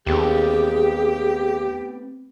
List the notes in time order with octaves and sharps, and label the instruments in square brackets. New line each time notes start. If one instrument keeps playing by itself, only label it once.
[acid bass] D#2 [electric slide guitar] A3 B3 C4 [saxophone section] G4 [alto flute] G#4